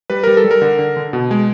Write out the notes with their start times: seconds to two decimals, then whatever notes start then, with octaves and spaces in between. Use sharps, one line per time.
0.10 G3 B4
0.23 G3 A#4
0.37 A4
0.44 G3
0.51 A#4
0.62 D3
0.79 D3
0.97 D3
1.13 B2
1.31 G#3